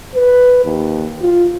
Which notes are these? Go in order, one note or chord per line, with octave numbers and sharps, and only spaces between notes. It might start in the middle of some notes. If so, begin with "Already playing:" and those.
B4
D#2
F4